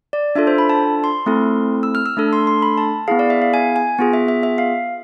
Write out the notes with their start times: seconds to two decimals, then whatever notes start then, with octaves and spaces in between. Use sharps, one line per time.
0.13 D5
0.35 D4 F4 A4 E5
0.47 C5
0.58 B5
0.69 A5
1.04 C6
1.26 A3 C4 E4 A4
1.83 E6
1.95 F6
2.06 E6
2.17 A3 D4 A4
2.33 C6
2.47 C6
2.62 B5
2.78 A5
3.08 B3 E4 G#4 F5
3.19 D5
3.30 E5
3.42 F5
3.54 G#5
3.76 G#5
3.99 B3 F4 G#4
4.13 E5
4.28 E5
4.43 E5
4.58 F5